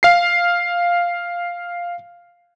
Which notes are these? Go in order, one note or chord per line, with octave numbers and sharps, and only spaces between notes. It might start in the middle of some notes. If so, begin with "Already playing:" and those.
F5 C7